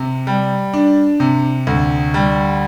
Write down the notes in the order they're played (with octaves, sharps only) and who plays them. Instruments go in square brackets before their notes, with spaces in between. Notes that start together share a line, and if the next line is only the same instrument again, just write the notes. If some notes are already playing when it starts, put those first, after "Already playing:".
Already playing: [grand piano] C3
G3
D4
C3
D2
G3